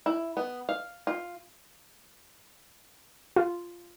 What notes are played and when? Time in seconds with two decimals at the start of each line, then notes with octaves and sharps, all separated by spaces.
0.06 E4
0.37 B3
0.69 F5
1.07 F4
3.36 F4